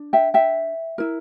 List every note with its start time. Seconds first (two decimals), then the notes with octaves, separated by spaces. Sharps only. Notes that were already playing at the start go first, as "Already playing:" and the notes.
Already playing: D4
0.13 E5 G5
0.34 E5 G5
0.98 E4 A#4